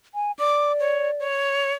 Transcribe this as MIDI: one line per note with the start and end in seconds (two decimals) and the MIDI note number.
0.15 0.32 80
0.39 1.25 74
0.39 0.72 86
0.80 1.11 73
1.19 1.73 73